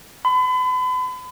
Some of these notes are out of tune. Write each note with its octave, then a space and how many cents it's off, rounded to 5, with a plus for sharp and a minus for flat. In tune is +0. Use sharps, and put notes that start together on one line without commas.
B5 +40